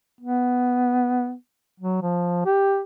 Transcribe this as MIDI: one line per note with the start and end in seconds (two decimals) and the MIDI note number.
0.21 1.34 59
1.80 2.01 54
2.02 2.43 53
2.46 2.82 67